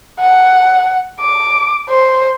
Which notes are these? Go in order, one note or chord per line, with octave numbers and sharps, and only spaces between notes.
F#5
D6
C5